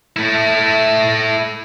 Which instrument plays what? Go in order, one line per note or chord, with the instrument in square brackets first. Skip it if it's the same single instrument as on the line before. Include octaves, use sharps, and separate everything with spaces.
[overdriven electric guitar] A3 E4